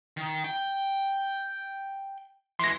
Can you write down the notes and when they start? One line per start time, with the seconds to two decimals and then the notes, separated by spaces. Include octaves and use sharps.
0.17 D#3
0.44 G5
2.59 E3 G#3 C6 A#6